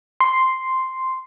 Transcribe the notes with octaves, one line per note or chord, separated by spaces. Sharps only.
C6